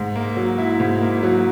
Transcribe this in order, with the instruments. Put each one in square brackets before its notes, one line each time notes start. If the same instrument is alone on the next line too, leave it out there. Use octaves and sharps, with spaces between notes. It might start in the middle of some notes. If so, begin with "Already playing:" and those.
Already playing: [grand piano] G#2
A#3
F#3
E4
G#2
A#3
F#3